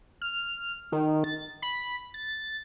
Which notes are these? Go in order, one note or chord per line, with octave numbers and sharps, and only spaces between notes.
F6
D#3
A6
B5
A6